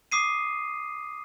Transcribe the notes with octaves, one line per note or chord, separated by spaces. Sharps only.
D6 D#6 C7 D#7